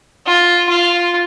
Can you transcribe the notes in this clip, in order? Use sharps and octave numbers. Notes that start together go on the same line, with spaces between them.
F4
F4